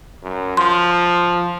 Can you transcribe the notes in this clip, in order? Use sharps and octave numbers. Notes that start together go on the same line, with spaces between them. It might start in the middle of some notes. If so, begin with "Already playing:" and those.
F#2
F3 C6